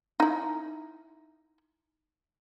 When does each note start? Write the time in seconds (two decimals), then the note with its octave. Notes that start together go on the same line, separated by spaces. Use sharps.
0.20 D#4 E4